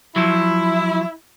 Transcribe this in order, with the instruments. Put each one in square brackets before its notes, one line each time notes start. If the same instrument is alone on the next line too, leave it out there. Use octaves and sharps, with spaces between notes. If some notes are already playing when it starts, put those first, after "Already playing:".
[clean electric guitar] F3 F#3 [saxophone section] E4